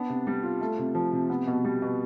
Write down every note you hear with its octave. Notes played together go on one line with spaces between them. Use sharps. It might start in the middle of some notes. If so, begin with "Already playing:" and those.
Already playing: B3 D4
C3
G3
F4
A3
C3
F3
C3
B3
B2
G3
B2